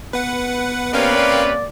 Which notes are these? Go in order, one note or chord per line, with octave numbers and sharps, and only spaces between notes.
B3 B4 F#5
C3 A#3 C#4 A#4 B4 D5 F5 G5